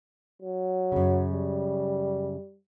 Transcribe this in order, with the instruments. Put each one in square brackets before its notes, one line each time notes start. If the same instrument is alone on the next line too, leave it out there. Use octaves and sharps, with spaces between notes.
[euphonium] F#3
[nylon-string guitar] F#2 C#3
[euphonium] G3